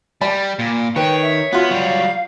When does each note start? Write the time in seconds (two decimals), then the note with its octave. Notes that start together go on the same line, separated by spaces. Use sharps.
0.21 G3 D5 B5
0.59 A#2
0.96 D#3 B4 C#5 G5
1.22 E5
1.53 B3 F4 F#4
1.71 F#3 G3 F5